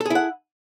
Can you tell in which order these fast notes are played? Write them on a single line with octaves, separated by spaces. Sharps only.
A4 G#4 E4 F#5